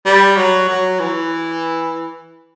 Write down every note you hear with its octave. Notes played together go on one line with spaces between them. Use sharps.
G3
F#3
F#3
E3